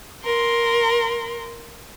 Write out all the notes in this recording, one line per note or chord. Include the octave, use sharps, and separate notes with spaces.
A#4 C6